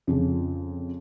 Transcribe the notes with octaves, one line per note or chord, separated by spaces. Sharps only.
F2 C#3 F3